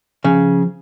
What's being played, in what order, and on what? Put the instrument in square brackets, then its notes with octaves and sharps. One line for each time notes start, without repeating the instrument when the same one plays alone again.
[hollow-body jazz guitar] C#3 [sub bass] F3